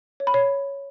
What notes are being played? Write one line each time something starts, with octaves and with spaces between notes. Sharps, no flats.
C#5
B5
C#5